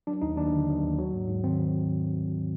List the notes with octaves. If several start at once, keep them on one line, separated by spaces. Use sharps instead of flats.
F#3 D4
D#2 D#4
D#2 D4
D3
F#3
D#2
F#3
G#2
G#2
D#3 C4